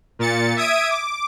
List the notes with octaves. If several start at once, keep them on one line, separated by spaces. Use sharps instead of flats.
A#2 A6 C#7
E5 D#6 G#6 D7 D#7
D6